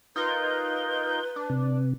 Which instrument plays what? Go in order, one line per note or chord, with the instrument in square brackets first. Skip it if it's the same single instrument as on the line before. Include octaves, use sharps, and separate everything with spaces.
[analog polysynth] D#4 F4 A#4 [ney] B4 [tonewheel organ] G6
[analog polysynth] D4
[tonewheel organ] C3